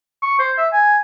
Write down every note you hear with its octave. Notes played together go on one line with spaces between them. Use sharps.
C#6
C5
E5
G#5